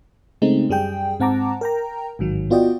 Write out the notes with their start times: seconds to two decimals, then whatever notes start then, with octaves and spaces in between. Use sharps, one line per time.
0.42 C#3 G#3 A3 C4 D#4
0.69 F#2 G3 G#4 G5
1.20 G#2 C4 F#5 A5 A#5 D6
1.61 A#4 G5 A#5
2.19 A1 G#2 D#3 F#3
2.50 B3 F4 F#4 D5 D#5 G5